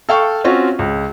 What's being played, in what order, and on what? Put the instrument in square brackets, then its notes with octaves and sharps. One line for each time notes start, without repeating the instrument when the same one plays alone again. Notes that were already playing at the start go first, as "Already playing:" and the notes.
[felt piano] A4 F5 G5 C#6
C4 C#4 F4 F#4
C#2